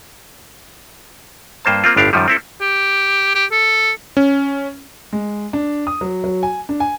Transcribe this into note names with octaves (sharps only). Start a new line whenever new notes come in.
G2 A#3 C5 A5
A#3 C4 F4
G1 A2 D4 G4 F5
F#2 D#3 F3 G3
C4 E4 A4
G4
G4
A4
C#4
G#3
D4
D#6
F#3
F#3
G#5
D4
G#5